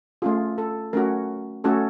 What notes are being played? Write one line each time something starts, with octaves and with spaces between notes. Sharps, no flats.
A3 C#4 F4 G#4
A4
A3 C#4 F#4 A#4
A3 C#4 F#4 A4